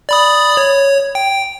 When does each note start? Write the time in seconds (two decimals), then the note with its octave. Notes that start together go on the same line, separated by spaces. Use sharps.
0.09 D5 B5 D#6
0.57 C#5
1.15 G5